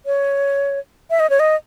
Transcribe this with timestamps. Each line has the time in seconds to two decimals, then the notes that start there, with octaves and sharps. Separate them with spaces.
0.06 C#5
1.10 E5
1.20 D#5
1.30 C#5
1.40 D#5